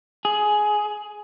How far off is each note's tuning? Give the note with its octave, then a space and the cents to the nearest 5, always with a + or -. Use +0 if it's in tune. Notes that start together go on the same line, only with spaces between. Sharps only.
G#4 +15